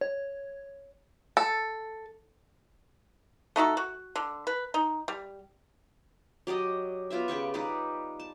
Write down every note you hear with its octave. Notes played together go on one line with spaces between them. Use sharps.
C#5
A4
A3 D#4 F#4 A4
F#4
D3
B4
D#4
G3
F#3 G4 D5 D#5
B3 F4 D5 E5
C#3 G4 B4 C#6
G3 D#4 G4 B4
A5